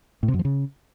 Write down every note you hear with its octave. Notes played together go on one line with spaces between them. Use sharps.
A2
C3
F#2
F3
C#3